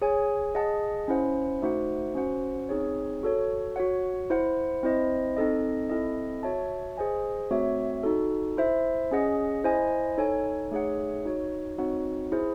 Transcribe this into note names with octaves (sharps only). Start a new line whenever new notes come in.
G#4 C#5 G#5
G#4 D#5 F#5 A5
C#4 E4 C5 F#5
A3 D#4 F#4 C5 F#5
C#4 F#4 C5 F#5
C4 D#4 G#4 C#5
F#4 A4 C#5
F#4 C#5 F#5
E4 C5 F#5
C4 E4 C5 D#5
C4 D#4 A4 D#5
C4 E4 A4 D#5
F#4 C#5 E5 A5
G#4 C5 D#5 G#5
A3 C4 F#4 C#5 E5
D#4 F#4 A4
E4 C5 E5
C#4 G#4 D#5 F#5
E4 C5 D#5 G#5
D#4 A4 C#5 G#5
A3 D#4 G#4 C#5 F#5
D#4 F#4 C#5
C4 D#4 F#4 C#5 F#5
E4 G#4 C5